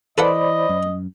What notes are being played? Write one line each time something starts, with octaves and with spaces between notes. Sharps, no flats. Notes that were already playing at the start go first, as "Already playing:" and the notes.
E3 A4 B4 C5 D5 D#5 F#5 B5
F#2